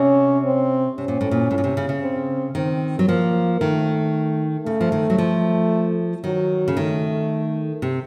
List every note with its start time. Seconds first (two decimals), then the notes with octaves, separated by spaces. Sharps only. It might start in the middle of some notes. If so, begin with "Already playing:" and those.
Already playing: C3 C#4
0.45 C4
0.98 C3 C#4
1.08 A#2
1.21 A2
1.31 A#2
1.51 A2
1.58 A#2
1.64 C3
1.77 C#3
1.89 C#3
2.02 C4
2.55 D#3 C4
2.99 F#3
3.08 F3 A#3
3.60 D#3 A3
4.66 C#3 A3
4.81 F3
4.92 D#3
5.10 F#3
5.18 F3
6.24 D#3 F#3
6.68 C#3
6.76 D#3 A3
7.82 C3